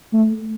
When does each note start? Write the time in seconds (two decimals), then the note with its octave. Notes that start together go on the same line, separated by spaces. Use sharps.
0.13 A3